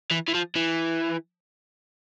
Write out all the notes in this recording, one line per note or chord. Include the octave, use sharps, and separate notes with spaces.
E3
E3
F3
E3